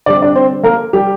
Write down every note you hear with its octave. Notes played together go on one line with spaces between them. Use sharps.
D3 G3 C4 D5
D4 D5
C4 C5
A#3 A#4
G3 G4